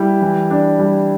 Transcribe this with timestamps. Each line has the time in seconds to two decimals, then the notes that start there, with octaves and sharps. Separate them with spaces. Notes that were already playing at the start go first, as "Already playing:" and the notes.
Already playing: G3 E4
0.21 E3
0.51 D4
0.79 G3